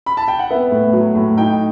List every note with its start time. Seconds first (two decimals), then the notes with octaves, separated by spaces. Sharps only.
0.06 B5
0.17 A5
0.28 G5
0.39 F#5
0.50 B3 E5
0.71 A2
0.93 F#3
1.15 A2
1.37 D#4 G5